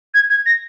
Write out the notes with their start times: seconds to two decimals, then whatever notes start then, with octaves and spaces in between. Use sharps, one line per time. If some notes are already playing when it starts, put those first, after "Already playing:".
0.14 G#6
0.29 G#6
0.46 A#6